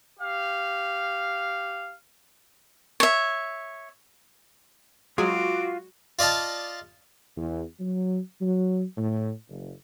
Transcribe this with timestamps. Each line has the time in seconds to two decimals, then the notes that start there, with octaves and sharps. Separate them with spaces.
0.18 G4 F5
3.00 C#5 E5
5.18 F#3 G#3 C4 F4 F#4 G#4 D6
6.19 F4 D5 D#5 F5 A5
7.37 E2
7.80 F#3
8.41 F#3
8.98 A2
9.49 F#1